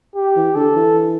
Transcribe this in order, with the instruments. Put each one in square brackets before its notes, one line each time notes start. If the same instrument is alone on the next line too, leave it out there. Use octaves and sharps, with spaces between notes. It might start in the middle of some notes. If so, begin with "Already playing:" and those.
[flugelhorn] G4
[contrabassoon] E3
[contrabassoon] D3 [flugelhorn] A4
[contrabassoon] E3